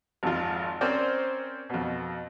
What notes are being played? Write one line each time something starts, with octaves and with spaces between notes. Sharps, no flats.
G#1 F2 F4
C4 C#4 A#4 C5 D5
F2 B2